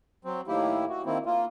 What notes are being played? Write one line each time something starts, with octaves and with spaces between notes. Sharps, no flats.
F#3 C4
A2 D#3 A#3 E4 G4
F#4
D#3 A#3 C4 E4
A#3 F4